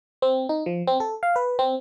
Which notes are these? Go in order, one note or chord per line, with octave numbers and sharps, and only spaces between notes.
C4
D#4
F3
C4
A4
F5
B4
C4